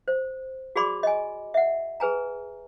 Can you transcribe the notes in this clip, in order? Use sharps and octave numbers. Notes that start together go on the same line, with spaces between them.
C5
F#4 G#4 D5 B5 C6 D6
D#5 G#5
E5 F#5
G#4 B4 G#5 A#5